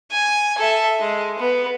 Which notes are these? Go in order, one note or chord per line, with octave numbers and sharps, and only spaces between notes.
G#5
A4 E5
G#3
B3